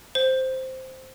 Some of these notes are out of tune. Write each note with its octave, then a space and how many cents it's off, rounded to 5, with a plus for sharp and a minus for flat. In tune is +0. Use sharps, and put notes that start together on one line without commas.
C5 +0